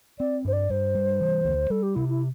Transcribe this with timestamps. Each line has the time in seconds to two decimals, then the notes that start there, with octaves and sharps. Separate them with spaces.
0.19 C4 D5
0.45 G2 C5
0.53 D5
0.70 G2 C5
0.95 G3
1.21 E3
1.45 D2
1.70 G3 A4
1.83 G4
1.95 C3 E4
2.09 E4